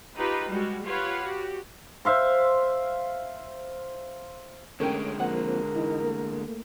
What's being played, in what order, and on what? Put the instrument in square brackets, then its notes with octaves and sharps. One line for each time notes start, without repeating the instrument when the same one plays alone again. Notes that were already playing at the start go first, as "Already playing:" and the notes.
[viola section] D#4 F4 G4 B4
G3 G#3 F#4
F4 G4 B4 C#5 F5 F#5
F#4 G4
[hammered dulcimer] C5 E5 F5 C6
[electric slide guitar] D3 G#3 [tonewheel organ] A3 C#5 D6 [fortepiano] C#4 A#4 G5
[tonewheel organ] F3 A#3 C4 [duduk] A#4 [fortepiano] F#5
[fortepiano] E3 [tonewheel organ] D#4
[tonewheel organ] A3 A#3